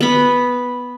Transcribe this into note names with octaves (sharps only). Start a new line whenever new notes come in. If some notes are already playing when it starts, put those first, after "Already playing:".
B3 B5